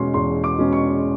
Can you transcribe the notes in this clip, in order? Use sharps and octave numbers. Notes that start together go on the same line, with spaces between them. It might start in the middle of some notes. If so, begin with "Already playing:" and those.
Already playing: E2 B2 G#3 C#4 C6 C#6
E2 C6
D6
B2 G#3 C#4
C#6